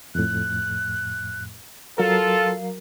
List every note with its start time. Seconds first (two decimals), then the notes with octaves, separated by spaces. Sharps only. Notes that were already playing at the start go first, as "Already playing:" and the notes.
0.15 F2 A2 F#6
1.98 F#3 F4 A4 A#4 F5